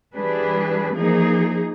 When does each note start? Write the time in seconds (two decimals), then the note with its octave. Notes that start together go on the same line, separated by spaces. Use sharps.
0.14 E3 G3 D4 G#4 B4
0.95 E3 F3 A#3 D#4 G#4